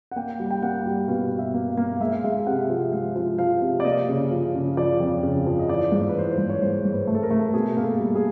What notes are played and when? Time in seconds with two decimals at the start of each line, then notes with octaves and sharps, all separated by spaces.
0.11 F#5
0.16 A#3 G5
0.40 G3
0.51 G5
0.62 A#3 F#5
0.86 G3
1.08 B2 F5
1.31 B2
1.39 E5
1.54 A#3
1.70 F5
1.77 A#3
2.00 G#3 E5
2.13 F5
2.24 G#3 E5
2.47 C3 F#5
2.70 F3
2.93 G#3 F5
3.16 F3
3.38 F3 F5
3.61 C3
3.80 D5
3.85 A#3 D#5
4.09 C#3
4.31 F3
4.55 C#3
4.77 F3 D5
5.00 F2
5.23 C#3
5.46 F3
5.59 D#5
5.69 E3 D5
5.92 G#2
6.00 C5
6.09 B4
6.15 E3 C5
6.30 C5
6.38 G#2
6.50 C#5
6.62 G#2 C5
6.85 G#2
6.93 B4
7.07 A3
7.15 A4
7.23 A#4
7.31 A3
7.54 B2 G#4
7.77 A#3
7.84 A4
8.00 G3
8.15 G#4